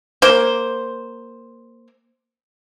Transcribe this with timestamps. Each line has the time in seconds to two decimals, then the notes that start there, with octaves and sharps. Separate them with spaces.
0.22 A#3 C5